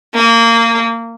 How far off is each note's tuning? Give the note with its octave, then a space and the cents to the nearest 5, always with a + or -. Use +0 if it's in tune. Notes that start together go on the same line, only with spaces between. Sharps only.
A#3 -20